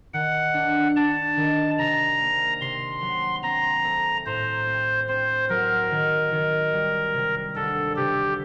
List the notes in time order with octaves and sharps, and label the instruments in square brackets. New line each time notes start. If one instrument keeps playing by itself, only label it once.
[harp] D#3 [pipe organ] F#5
[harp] D4
[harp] D4 [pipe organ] A5
[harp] D#3
[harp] C3 [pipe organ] A#5
[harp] A#3
[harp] C3 [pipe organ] C6
[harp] F#3
[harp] C4 [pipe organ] A#5
[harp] A3
[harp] A2 [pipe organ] C5
[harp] C4
[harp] C4 [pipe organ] C5
[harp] F#3 [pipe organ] A#4
[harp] D#3
D#3
G3
C3
[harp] D2 [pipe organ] A4
[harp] C3 [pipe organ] G4